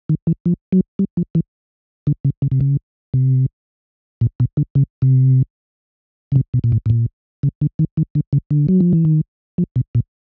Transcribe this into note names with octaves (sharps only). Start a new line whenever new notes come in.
D#3
E3
F3
F#3
G3
F3
E3
D3
C#3
C#3
C3
C#3
C3
A#2
B2
D3
C#3
C3
C#3
C3
B2
A#2
A2
A2
A#2
C#3
D3
D#3
D#3
D3
C#3
D3
F#3
F3
E3
D#3
F3
B2
A#2